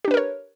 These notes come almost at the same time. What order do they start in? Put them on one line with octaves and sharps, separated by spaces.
G4 D4 B4 A#4 C#5